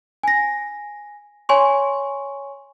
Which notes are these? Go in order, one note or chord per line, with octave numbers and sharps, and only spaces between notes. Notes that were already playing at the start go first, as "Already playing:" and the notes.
G#5 A#6
C#5 G#5 C6 C#6